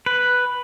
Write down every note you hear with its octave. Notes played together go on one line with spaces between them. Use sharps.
B4